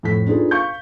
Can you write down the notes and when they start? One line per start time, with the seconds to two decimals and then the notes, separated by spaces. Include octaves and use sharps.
0.03 F2 A2 B6
0.26 D4 D#4 F4 G#4 A4 B4
0.51 F5 C#6 G6